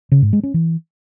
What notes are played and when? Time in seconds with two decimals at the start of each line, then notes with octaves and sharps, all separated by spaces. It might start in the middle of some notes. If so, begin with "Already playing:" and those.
0.12 C#3
0.22 G#2
0.33 G#3
0.43 C#4
0.54 E3